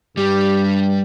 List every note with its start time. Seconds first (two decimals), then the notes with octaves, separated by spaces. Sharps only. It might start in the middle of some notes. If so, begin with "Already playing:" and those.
0.17 G2 G3 G4